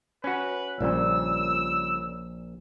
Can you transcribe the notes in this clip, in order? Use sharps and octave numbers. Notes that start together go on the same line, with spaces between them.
C#4 F#4 B4
A#1 A#2 C#3 G3 F4 E6